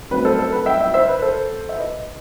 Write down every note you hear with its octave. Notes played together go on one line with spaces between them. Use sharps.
G1 F#2 F#3 A3 C4 B4
A4 C5
A4
B4
E5 G5
E5 G5
C5 E5
B4
A4 C5
E5
B4 D#5